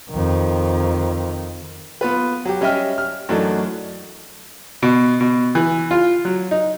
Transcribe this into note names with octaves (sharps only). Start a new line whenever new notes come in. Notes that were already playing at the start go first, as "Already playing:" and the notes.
F2 D#3
B3 F4 B4
F#3 G4
G3 C#4 D#5 E5 G5 F6
F6
F#2 E3 F#3 A3 D4 D#4
B2
B2
E3
F4
F#3
D#4